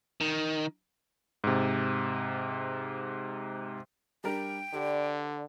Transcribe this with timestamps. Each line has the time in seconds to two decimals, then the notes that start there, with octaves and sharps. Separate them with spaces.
0.21 D#3
1.44 G#2 C3
4.24 G3 D4 A#4 G5
4.74 D3 G4 B4 C5 D5